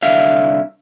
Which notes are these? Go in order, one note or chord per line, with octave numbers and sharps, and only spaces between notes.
C2 D3 E5 F5